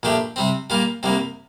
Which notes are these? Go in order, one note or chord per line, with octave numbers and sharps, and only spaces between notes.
A#1 A#2 A3 D4 G4
C3 G3 C4
A#2 G3 A#3 F4
C2 C3 G3 A#3